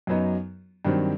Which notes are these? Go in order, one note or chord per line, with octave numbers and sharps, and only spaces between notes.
F#2 F#3 B3 D#4
G2 D#3 F#3 C4